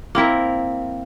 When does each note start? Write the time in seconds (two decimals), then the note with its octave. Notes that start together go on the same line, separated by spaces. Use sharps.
0.15 A#3 C4 E4 A#4